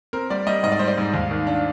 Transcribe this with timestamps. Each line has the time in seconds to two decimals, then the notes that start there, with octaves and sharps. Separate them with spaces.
0.13 C4 A#4
0.30 G3 D5
0.47 G3 D#5
0.63 G#2 D#5
0.72 D5
0.79 G3 C5
0.87 D5
0.98 G#2
1.14 D#2
1.31 D#3
1.47 D4